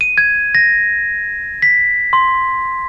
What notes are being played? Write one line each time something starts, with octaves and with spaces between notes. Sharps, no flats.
D#7
G#6
A#6
B6
C6